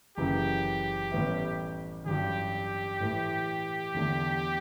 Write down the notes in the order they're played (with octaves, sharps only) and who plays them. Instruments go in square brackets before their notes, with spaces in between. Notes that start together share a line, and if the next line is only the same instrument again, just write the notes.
[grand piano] F#1 F#2 C#3 E3 [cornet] G4
[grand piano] A1 A2 G3 B3 E4
[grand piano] A1 G2 F#3 [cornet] G4
[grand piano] A2 E3 A3
E2 D3 A3 D4